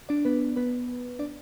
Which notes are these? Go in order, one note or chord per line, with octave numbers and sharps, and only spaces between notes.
D4 D5
B3 B4
B3 B4
D4 D5